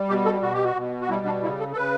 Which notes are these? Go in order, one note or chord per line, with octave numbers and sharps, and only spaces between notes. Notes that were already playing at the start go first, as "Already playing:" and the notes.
Already playing: G3
B2 G4
A4
B2 F#4
G4
F#4
B2
F#4
G3 E4
D4
C#3 E4
A4
A4
C#3 B4